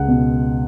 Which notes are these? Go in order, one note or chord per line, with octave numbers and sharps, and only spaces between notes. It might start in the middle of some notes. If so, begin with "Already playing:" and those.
Already playing: C#2 F#5
B2